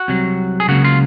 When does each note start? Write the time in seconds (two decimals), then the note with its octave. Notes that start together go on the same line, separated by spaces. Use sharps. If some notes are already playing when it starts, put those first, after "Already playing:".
Already playing: F#4
0.08 C2 C3 F#3
0.60 G#4
0.68 C#2 C#3 F#3 A#3 F#4
0.84 F4